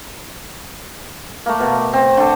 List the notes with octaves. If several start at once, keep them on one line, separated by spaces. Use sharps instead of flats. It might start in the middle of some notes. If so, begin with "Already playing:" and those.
A3 A#3
B2
C4
D3 A4